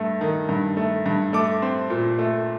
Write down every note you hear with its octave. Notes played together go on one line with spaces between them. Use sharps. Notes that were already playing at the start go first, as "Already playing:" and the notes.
Already playing: G2 A3
D#3
G2
A3
G2
A3 D6
C4
A#2
A3